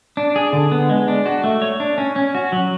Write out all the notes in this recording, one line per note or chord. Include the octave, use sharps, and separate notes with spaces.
D4
G#4
D3
B3
G#3
D4
F#4
A3
C#5
D4
C#4
C#4
F#4
F#3